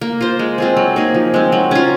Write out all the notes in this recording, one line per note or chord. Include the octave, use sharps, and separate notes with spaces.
A#3
F4 C5
G#3
C4 F4 G#4
F#3
A#3 D#4 G#4
F3
G#3 C4
F#3
C#4 F4